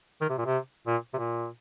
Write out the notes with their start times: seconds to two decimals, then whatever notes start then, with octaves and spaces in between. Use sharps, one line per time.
0.21 D#3
0.29 C3
0.38 A#2
0.45 C3
0.87 A#2
1.14 C3
1.18 A#2